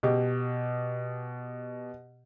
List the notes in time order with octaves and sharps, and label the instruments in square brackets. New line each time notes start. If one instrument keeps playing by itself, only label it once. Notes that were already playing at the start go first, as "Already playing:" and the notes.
[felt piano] B2 G4